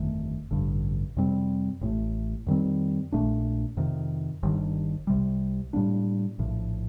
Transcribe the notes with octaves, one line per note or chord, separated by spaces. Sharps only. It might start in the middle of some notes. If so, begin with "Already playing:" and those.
Already playing: G1 F2 D#3 A3
A1 G2 D3
F2 C3 G3 C4
A1 A2 A3
F2 D#3 G3 C4
A#1 A#2 A3 D4
F2 C3 D#3
G1 G2 D#3
C2 C3 G3
A2 G3 A#3 D4
A#1 A2 F3